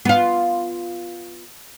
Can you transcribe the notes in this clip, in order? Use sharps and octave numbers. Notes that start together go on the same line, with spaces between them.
B3 F4